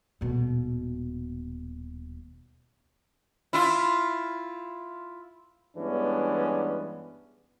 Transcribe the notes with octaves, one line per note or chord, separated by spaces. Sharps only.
D#1 B2
E4 F4
G2 E3 G#3 B3 C#4 D4